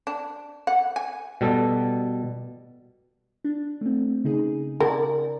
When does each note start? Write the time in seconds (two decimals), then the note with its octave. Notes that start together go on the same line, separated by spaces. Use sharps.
0.07 D4
0.67 F#5
0.96 G#5
1.41 B2 G3 A4
3.44 D4
3.81 A3 C4
4.24 C#3 D#4 G#4
4.80 C#3 A#4 D5 A5